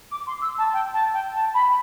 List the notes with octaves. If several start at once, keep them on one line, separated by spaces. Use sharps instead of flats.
D6
C6
E6
A5
G5
A5
G5
A5
B5